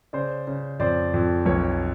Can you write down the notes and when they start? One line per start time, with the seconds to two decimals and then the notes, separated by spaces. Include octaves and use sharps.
0.13 C#3 C5 D5
0.47 C#3
0.80 F2 C5 D5
1.14 F2
1.46 B1 B4 C#5